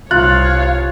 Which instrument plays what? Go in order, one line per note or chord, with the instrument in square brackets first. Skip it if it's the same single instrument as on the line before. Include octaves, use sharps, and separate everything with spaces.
[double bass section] C2 [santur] F4 [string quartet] C#5 F5 [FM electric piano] F#6